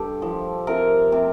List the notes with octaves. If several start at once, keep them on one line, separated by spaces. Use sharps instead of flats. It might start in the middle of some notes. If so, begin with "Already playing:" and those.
Already playing: G2 G4 A4
F3
C3 A#4
C3